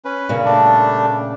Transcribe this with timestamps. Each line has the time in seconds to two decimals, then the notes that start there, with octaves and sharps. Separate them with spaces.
0.05 C#4 B4
0.29 A#2 C#3
0.45 G3 A3 D4